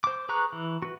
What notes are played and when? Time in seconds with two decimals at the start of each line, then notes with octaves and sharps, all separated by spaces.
0.04 C5 D6
0.29 G#4 B4 A#5 C#6 F#6
0.52 E3
0.82 F#4 B4